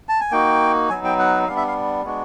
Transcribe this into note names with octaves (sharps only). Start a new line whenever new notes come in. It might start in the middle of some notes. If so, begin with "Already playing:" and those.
A5
G#5
A#3 D#4 F#4 G5
F#3 B3 D#4 G#5
G5
F#5
G3 B3 D4 F5
E5
F5
G#3 B3 D4 F#4